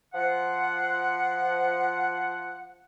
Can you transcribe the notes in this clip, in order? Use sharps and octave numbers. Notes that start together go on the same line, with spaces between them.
F3 F#5